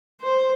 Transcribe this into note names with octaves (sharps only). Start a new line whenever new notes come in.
C5